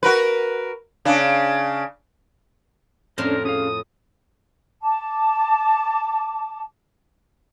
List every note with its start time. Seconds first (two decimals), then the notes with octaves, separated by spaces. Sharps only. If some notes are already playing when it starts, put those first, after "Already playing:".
0.03 F#4 A#4 B4
1.05 C#3 D4
3.18 F2 A2 C#4 D4 A#4 C5 C6
3.45 C#4 G#4 F5 D#6
4.83 A5 D6